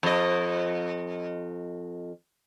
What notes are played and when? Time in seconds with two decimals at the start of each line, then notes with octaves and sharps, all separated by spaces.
0.03 F2 D#5